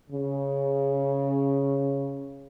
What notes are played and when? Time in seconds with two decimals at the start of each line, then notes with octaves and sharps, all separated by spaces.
0.10 C#3